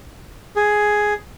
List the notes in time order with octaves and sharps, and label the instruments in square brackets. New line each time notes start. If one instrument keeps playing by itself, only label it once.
[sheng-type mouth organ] G#4